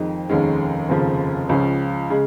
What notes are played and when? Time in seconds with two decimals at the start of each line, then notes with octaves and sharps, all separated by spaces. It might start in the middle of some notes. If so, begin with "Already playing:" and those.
Already playing: F2 D#3 G#3 D#4
0.29 F1 D#2 D#3 G#3 C#4
0.89 F1 D#2 C#3 F3
1.49 C#2 C#3 F3 C#4
2.10 C#3 G#3